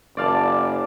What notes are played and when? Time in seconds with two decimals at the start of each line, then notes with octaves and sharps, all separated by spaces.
0.17 F#1 D5 F5 A5